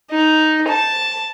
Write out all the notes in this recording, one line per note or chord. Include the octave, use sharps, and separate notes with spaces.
D#4
A5